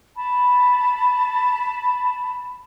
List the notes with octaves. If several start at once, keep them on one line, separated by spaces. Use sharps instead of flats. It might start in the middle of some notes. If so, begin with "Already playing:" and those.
A5 B5